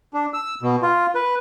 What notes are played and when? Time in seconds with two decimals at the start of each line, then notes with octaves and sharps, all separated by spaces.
0.14 D4
0.34 E6
0.62 B2
0.82 F4
1.15 B4